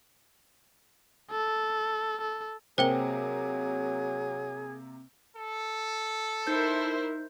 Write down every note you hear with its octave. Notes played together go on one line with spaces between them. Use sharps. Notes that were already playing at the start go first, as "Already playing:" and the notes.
A4
A4
C3 F#3 A#3 G#4 C5 G5 G7
A4
D#4 E4 A#4 C5 G6